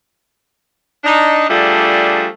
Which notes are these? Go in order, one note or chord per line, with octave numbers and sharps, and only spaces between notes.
D4 D#4
F3 G3 A3 D4 G#4